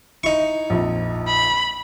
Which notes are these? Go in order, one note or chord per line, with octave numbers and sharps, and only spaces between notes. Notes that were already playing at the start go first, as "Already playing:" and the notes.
D#4 E4 C#6
A#1 F2
B5